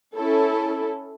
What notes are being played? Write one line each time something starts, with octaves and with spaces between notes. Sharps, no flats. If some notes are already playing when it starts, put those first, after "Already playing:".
C#4 E4 A4